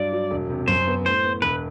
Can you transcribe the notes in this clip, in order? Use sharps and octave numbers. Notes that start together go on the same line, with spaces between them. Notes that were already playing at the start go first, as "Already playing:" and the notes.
Already playing: G2 F#3 D5
F#3
E1
C3
F#2 C5
B3
A2 C5
B3
E1 B4